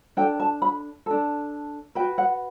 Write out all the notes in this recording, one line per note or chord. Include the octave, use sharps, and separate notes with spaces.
D4 A4 G5
A5
B5
D4 A4
F#4 B4 G5
F#5